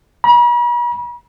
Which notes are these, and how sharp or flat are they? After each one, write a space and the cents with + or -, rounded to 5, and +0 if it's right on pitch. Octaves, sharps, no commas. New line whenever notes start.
B5 -45